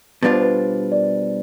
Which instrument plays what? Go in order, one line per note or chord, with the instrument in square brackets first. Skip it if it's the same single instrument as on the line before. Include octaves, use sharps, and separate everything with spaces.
[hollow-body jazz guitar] B2 G3 D4 F4 [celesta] B4
[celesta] C5
B4
D5